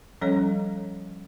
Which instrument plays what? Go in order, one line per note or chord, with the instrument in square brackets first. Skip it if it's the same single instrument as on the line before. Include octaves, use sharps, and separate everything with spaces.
[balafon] F3 G3 C#4 A4 C#5 A#5